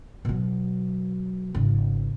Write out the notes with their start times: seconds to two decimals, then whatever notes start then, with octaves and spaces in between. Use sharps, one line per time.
0.25 B2 F#3
1.54 G#1 C#3